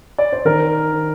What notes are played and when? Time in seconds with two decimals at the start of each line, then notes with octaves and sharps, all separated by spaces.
0.18 D5
0.32 C5
0.45 D#3 A#4